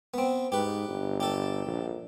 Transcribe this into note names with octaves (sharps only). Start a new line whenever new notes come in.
B3 C4
G#2 G4 B4
G1
G4 A4
A#1